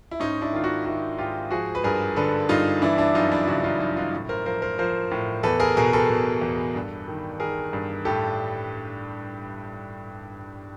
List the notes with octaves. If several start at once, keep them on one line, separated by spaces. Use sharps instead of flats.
E4
G#2 C#4 D#4
D4 E4
D#3 F4
E4 F#4
D#3 E4 F#4
G#2 F4 G4
F3 F#4 G#4
B4
G2 G#4 A#4
D3 A4 B4
G2 D#4 F4
E3 D4 E4
D4 E4
F#2 D#4 F4
D4 E4
C#3 E4 F#4
D#4 F4
F#2 D#4 F4
D#4 F4
A2
A#4 C5
F3 A#4 C5
A#4 C5
F3 A#4 C5
A2
E2 A4 B4
G#4 A#4
B2 G#4 A#4
A4 B4
B2
E2
G2
D#3
D#3 G#4 A#4
G2
A2 G4 A4